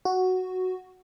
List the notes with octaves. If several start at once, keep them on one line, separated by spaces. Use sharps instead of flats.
F#4